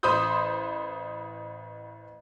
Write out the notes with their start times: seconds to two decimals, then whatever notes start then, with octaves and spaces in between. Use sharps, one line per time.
0.03 A1 C5 B5 C6 D#6 G6